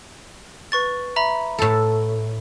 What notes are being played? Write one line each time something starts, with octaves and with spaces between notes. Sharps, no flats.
B4 C#6 A6
E5 A#5 B5
A2 A4